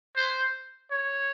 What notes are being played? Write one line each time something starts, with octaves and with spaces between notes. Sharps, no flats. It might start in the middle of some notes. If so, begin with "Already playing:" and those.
C5
C#5